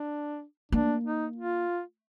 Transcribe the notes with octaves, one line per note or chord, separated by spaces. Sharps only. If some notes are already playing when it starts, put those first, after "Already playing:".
Already playing: D4
A#3 D4
D#4
F4